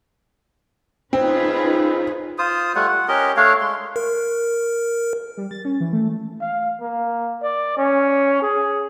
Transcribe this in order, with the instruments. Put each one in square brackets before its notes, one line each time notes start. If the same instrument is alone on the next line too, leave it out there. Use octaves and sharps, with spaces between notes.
[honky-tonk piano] C4 [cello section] C#4 G#4 B4 [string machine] D#4 F4
[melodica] F4 C5 D#6
G3 A3 F4 F#5
F#5
C#4 G4 A#4 D#5
A3 D4 C#5 F5
G#3 C6
[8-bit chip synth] A#4
[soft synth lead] G3
A6
C#4
E3
A3
[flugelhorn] F5
A#3
D5
C#4
G#4